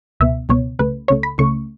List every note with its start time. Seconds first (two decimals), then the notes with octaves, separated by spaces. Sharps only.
0.20 C#2 B2 B3 E5
0.49 C#2 B2 B3 C#5
0.79 C#2 C#3 A3 B4
1.08 C#2 C#3 A3 C#5
1.23 B5
1.38 C#2 C#3 A3 C#4 C#6